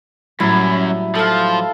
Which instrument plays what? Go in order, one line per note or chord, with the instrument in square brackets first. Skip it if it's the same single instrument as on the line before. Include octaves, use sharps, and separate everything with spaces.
[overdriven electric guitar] F#2 [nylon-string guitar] A2 F#3 G3 [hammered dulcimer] E4
[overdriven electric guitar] F3 [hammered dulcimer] A4 F5